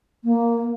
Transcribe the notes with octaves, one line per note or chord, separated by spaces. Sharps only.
A#3